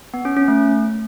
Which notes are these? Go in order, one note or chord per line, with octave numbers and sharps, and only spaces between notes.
B3
C#4
C#4
A3